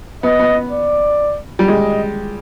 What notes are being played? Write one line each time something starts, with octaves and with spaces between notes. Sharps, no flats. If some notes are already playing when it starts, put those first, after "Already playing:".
B3 D#5
B3
D5
G3
G#3 D#5